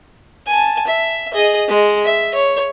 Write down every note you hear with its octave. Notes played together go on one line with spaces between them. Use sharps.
G#5 A5
E5
G#4 D#5
G#3
E5
C#5